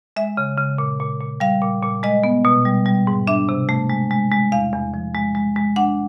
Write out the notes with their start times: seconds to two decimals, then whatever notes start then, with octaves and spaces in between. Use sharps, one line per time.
0.16 G#3 E5
0.37 C#3
0.58 C#3
0.78 A#2
1.00 A#2
1.21 A#2
1.40 G3 F5
1.62 A#2
1.83 A#2
2.03 G#3 D#5
2.24 B3
2.45 B2
2.65 G3
2.86 G3
3.07 G#2
3.27 D4 E5
3.49 C3
3.69 A3
3.90 G#3
4.11 G#3
4.31 G#3
4.52 E2 F5
4.73 E2
4.94 F3
5.15 G#3
5.35 G#3
5.56 G#3
5.76 D4 F#5